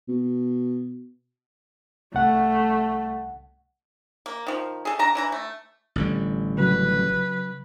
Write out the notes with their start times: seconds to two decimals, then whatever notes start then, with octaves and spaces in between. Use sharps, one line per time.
0.09 B2
2.14 C2 A3 F#5
4.26 A#3
4.47 D#3 F3
4.85 G#4 A4
4.99 D3 A5 A#5
5.15 D3 E3 A#5
5.32 A3
5.96 A1 D3 G3
6.58 C#3 F#3 B4